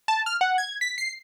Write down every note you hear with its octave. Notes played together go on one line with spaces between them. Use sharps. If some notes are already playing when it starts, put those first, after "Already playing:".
A5
F6
F#5
G#6
B6
C7